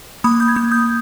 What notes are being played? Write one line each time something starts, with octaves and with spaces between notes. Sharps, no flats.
A#3 B5 D#6
D#6 G6
G#6
A#3 D#6 G6
D#6 G6